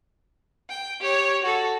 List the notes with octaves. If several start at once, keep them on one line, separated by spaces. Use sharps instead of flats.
G5
G4 C#5
F#4 A4